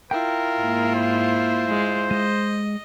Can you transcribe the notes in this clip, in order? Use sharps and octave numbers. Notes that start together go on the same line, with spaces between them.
E4 F4 A#4 G5
G#2 A#3
C5
G#3
G#3 D#5